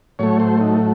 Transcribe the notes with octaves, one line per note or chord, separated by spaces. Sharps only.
A2 F#3 A3 C#5
C5
D#4